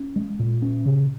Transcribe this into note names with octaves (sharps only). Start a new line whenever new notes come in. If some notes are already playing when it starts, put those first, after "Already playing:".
Already playing: C#4
G#3
A#2
C#4
C#3